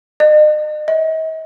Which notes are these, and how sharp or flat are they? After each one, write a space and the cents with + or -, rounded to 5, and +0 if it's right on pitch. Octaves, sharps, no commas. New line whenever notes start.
D#5 -40
D#5 +45